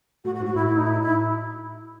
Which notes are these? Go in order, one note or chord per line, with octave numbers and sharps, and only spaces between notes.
A2 F#4
F#4
G#2
F#4
A2 E4
E4
D#4
E4
E4